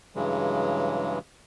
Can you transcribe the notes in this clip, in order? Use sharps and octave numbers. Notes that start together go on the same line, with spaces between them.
G2 C#3 E3 F#3 G#3